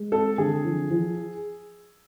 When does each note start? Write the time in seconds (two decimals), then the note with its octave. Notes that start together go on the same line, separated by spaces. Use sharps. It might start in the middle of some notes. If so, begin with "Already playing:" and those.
Already playing: G#3
0.12 C4 A4
0.38 D3 G#4
0.64 F3
0.91 F3